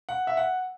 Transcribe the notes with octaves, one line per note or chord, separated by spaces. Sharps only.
F#5
E5
F#5